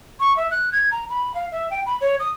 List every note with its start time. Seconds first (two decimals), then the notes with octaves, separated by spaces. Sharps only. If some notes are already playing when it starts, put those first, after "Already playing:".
0.20 C#6
0.37 E5
0.51 F#6
0.72 G#6
0.91 A#5
1.10 B5
1.34 F5
1.52 E5
1.71 G5
1.86 B5
2.01 C#5
2.20 D#6